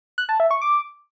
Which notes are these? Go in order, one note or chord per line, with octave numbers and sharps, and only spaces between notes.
F#6
A5
E5
C#6
D6